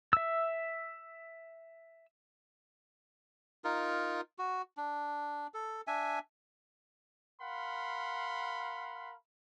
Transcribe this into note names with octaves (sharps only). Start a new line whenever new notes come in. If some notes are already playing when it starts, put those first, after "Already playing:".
E5 E6
D#4 F4 A#4
F#4
D4
A4
D4 E5 G#5
A#4 F5 F#5 B5 C6